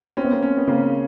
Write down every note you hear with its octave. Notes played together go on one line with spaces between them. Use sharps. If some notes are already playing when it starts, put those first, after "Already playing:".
C4 C#4
B3
A#3 C4
C#4
B3
C#3 A#3 C4